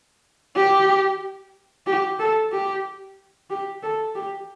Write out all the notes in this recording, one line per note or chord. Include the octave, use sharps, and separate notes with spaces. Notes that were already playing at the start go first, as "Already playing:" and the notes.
G4
G4
A4
G4
G4
A4
G4